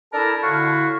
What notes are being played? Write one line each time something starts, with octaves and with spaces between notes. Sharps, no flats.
D4 E4 A4 A#4 A5
A2 D3 E4 F#4 F5 C#6